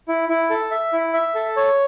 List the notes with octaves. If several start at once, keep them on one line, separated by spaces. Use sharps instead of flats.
E4
E4
A4
E5
E4
E5
A4
C#5